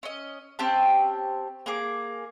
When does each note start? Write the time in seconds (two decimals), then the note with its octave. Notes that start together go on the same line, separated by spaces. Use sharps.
0.03 C#4 D#5
0.59 C4 C#4 G4 A5
1.66 A#3 G#4 D6